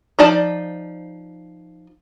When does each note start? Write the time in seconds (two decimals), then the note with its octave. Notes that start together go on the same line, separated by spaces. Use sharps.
0.19 F3 D#4 D5 A5